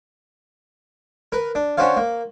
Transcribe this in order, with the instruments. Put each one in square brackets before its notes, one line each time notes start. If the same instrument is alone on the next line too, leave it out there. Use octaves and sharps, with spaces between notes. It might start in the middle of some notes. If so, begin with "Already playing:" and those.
[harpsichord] A#4 B4
D4
C#4 D4 F#4 C5 C#5 F5
A#3